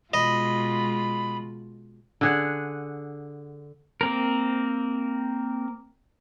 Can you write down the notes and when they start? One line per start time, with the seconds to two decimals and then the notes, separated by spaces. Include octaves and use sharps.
0.14 B2 G#3 F4 D#5 B5
2.21 D3 G#4 F#5
4.01 A#3 C4 A#4